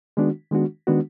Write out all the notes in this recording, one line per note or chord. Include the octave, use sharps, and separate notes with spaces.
D#3 G#3 B3 D4 F#4
D#3 G#3 B3 D4 F#4
D#3 G#3 B3 D4 F#4